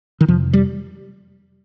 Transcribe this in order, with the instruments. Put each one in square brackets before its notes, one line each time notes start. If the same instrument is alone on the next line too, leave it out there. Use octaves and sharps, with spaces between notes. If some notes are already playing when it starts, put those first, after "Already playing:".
[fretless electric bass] D#3
F2 C3 F3
G3